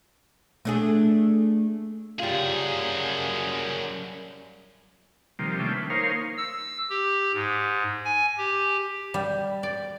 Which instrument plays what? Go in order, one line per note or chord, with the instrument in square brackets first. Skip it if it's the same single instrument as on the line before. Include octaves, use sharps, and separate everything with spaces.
[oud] A3 D4 G#4
[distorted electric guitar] F#2 G#4 [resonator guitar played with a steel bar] G3 F4
[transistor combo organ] C3 D#3 F3 G3 A#3
A3 C#4 D4 F4 E5 G5
B4
A#3 D#4 A#4 C5 C#5 F5
[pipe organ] E6
G4
G#2
G#5
G4
[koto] G3
D5